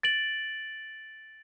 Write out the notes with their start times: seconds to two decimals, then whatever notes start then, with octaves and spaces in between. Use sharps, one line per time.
0.03 A6 D7 F#7